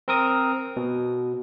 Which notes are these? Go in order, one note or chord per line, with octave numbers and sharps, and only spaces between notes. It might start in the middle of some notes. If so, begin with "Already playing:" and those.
C4 A#4 D#6
B2